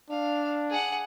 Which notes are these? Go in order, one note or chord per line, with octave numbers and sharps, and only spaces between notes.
D4 F5
G#4 F#5